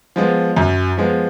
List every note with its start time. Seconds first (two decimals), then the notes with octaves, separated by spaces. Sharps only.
0.16 F3 G#3 B3
0.57 F#2
0.97 F3 G#3 B3